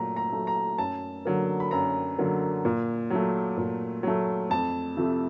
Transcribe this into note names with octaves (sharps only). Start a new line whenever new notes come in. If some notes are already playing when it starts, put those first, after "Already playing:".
Already playing: A#2 F#3 A3 A#5
A#5
F#3 A3
A#5
F#2 A5
D3 F#3 A#3
B5
F#2 A#5
D3 F#3 A#3
A#2
F#3 A3
A#2
F#3 A3
F2 A5
C3 F3 A3